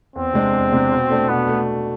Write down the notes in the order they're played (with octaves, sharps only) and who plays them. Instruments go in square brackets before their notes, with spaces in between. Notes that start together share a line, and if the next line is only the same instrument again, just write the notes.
[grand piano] E2 [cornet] C4
[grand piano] C3 G#3 D4
E2
C3 G#3 D4
B2
A3 D4
[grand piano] B2 [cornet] B3
[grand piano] A3